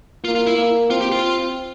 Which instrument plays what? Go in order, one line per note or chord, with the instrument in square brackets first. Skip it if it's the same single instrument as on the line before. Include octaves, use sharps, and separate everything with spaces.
[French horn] A#3 [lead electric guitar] F4
[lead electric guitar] F4
E4
[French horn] A#3
[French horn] C4 [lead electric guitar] F4
[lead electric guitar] G4
F4